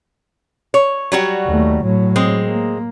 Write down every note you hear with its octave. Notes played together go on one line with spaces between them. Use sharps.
C#5
F#3 G3 F#4
D#2 A3
A2 F#3
G#3 C4
A#3